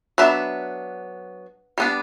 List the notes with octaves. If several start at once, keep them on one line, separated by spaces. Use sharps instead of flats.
F#3 B3 D4 E5
G3 B3 D4